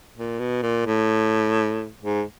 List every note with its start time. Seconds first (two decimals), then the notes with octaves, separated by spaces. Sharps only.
0.16 A#2
0.39 B2
0.62 A#2
0.86 A2
2.02 G#2